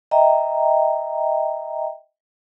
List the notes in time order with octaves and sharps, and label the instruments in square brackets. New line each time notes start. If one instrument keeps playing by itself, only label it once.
[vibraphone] D#5 E5 G5 A#5